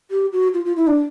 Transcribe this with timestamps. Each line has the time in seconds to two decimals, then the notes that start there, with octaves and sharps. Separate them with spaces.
0.11 G4
0.33 F#4
0.54 F4
0.65 F4
0.76 E4
0.87 D4